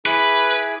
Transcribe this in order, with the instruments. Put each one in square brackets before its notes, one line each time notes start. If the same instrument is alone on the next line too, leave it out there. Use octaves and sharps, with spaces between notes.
[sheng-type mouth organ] E4 G#4 D6 [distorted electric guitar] B4